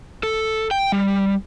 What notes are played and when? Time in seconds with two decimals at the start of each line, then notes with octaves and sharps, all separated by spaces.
0.23 A4
0.71 G5
0.92 G3